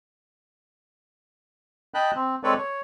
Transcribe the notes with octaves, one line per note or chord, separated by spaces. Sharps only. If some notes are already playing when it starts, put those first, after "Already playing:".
D#5 G5 A5 B5 F#6
C4
G#3 C4 A4 B4 C#5 D5
C#5